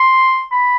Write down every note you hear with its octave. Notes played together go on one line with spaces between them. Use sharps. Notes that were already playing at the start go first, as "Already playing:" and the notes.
Already playing: C6
B5